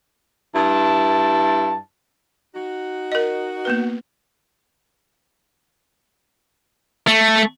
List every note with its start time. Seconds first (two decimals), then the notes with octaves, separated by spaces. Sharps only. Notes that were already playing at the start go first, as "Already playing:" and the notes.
0.55 G2 E4 A5
2.55 D#4 F#4
3.12 A#4 D#5
3.65 A#3 B3 B4
7.07 A3